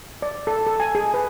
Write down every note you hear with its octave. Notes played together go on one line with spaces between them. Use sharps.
D5
A4
A4
G#5
G#4
B4